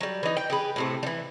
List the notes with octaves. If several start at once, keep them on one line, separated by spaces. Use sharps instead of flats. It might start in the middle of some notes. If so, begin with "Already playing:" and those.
F#3 G3
E3 D#4
G5
G4 G#4 B4
A2 C3 A3
E3 G3